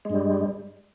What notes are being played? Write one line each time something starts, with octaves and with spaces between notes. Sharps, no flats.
G2 G3 G#3